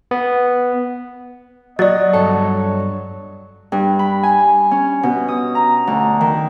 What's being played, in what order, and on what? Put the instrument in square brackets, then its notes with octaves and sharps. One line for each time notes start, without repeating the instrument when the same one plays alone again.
[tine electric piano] B3
[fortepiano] F#3 [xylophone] D5 A6 [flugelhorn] D#5
[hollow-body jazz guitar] G2 A4 [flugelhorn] C#5
[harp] G2
B5
G#5
C#4
B2
D#6
A#5
D2
D#3